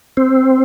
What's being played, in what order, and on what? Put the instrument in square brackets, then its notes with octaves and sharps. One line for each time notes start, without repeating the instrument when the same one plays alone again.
[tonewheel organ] C4